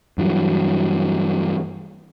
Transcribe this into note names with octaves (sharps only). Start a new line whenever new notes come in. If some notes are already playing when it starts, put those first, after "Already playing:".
G2 E3 F#3